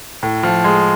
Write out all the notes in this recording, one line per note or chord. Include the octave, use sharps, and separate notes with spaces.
A2
F3
G#3